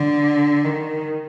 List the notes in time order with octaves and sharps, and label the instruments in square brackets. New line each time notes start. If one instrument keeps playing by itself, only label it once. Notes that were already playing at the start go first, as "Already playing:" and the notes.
Already playing: [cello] D3
D#3